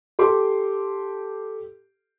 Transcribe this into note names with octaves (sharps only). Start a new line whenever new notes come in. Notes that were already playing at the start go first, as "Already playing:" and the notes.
G4 A4 C6 D6